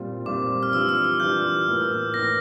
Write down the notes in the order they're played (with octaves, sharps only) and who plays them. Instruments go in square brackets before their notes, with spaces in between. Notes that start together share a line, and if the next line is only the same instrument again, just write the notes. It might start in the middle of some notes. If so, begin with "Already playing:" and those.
Already playing: [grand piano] A#2 G3 C4 F4
[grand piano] A#2 G3 C4 F4 [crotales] D6
[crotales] F6
[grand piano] E3 G3 D4 F4 [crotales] E6
[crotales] F6
F6
[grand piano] E3 G3 D4 F4 [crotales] G6
[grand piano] A2 E3 A#3
[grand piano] A2 E3 A#3 [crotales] A#6